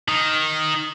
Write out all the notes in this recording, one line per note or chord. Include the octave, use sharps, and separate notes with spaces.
D#3